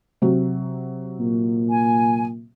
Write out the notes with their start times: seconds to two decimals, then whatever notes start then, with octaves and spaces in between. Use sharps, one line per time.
0.22 C3 F#3
1.20 A#2
1.70 G#5